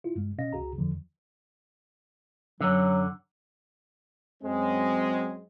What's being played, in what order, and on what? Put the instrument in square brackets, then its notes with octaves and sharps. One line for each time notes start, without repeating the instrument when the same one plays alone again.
[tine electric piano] E4 F4
G2 G#3
B2 C#4 D#5 F5 A#6
C#2 F#4 G#4 A#5
E2 D3 F3
[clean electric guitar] F#2 D3 [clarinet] F#3
[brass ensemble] F#2 G#3 [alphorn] C4